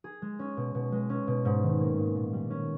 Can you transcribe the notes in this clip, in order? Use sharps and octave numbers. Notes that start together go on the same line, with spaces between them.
G#4
G#3
C#4
B2
B2
G#3
C#4
B2
G#2
D#3
A#3
G#2
A#2
G3
C#4